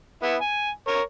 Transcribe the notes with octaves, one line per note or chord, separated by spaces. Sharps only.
B3 E4
G#5
A#4 C#5